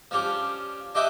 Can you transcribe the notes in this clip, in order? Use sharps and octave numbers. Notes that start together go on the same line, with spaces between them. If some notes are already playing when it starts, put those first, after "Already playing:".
F3 C#4 D4 G4
D4 G4 D#5 E5 F#5 G5